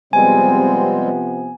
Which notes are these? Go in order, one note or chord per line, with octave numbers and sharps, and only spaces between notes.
C3 F3 G3 G#3 B3 C4 G#5